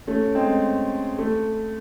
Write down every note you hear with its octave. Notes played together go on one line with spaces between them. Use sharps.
A3 C#4
G#3 C4
A3